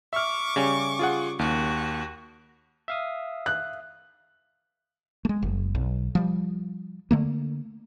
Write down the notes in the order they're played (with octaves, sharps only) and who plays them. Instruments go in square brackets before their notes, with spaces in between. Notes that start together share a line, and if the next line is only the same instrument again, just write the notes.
[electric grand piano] E5 F6 [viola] C#6 D6
[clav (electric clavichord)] C#3 G3 C#4
[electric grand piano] F4 G#4 F#5
[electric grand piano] D#2 [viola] F#4
[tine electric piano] E5 F5 D#6
[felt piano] F#6
[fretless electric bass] G#3 A3
F#1
B1
F3 G3
D3 A3 A#3